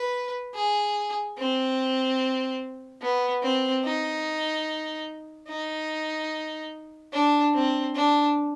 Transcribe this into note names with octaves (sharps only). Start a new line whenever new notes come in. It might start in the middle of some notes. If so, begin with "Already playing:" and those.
Already playing: B4
G#4
C4
B3
C4
D#4
D#4
D4
C4
D4